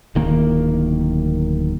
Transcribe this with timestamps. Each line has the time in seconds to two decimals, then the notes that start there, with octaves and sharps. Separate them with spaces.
0.15 D1 D#3 A#3